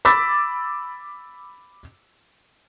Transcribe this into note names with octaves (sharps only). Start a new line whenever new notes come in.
B5 D6 E6 A6 B6